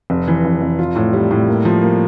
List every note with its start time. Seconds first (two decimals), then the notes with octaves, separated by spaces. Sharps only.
0.10 F1
0.28 E3
0.45 F1
0.62 F1
0.79 F4
0.96 A2
1.13 G3
1.31 A2
1.47 A#3
1.65 F3
1.82 A#3